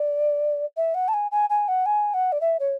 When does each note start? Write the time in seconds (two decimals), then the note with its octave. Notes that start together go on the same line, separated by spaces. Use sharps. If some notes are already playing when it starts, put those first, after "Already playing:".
Already playing: D5
0.76 E5
0.94 F#5
1.08 A5
1.13 G#5
1.31 G#5
1.49 G#5
1.68 F#5
1.85 G#5
2.13 F#5
2.32 D5
2.40 E5
2.59 C#5